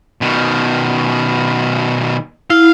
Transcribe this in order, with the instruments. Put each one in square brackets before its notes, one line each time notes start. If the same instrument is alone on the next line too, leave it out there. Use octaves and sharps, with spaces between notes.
[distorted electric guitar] B2 D#3
[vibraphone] E4 [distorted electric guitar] F5